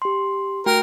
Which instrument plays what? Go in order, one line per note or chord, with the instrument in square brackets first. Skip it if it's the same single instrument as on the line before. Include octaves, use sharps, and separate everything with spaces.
[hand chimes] G4 C6
[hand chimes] A3 F#4 G5 [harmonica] A#4